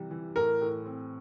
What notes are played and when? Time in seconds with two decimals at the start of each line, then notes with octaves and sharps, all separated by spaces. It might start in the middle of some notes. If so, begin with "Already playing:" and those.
Already playing: C3 E3 G3
0.11 E3
0.36 A2 A#4
0.61 A2
0.85 C4